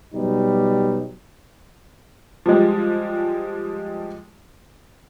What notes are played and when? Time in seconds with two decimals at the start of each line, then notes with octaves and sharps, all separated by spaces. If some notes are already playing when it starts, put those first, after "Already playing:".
0.15 B2 F#3 G3 D#4
2.46 F3 G3 G#3